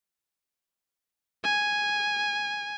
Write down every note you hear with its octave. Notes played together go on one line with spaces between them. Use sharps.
G#5